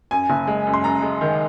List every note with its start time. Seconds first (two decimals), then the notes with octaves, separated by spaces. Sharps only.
0.11 F#2 G#5
0.30 F#1
0.47 G#3
0.67 F#2
0.74 C6
0.84 F#2 A#5
1.02 G#3
1.21 D#3